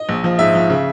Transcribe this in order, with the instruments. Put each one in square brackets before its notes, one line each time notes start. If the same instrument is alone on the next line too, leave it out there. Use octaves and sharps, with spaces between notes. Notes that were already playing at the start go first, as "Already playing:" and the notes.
Already playing: [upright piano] D#5
A#1
F3
G#2 E5
F3
C#3